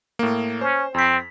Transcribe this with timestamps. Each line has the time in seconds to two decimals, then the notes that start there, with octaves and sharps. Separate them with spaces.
0.19 A2 A#3
0.61 C#4 C5
0.94 F2 C4 B6